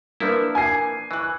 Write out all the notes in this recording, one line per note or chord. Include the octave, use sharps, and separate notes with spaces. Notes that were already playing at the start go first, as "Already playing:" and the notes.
F3 A#3 D4 E4 B4
G#5 G#6 C7
E3 C#6 F#6